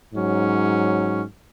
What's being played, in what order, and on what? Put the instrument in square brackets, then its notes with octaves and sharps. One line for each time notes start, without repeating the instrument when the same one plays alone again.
[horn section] G#2 F#3 C#4